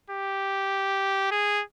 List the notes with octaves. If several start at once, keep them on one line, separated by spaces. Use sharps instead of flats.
G4
G#4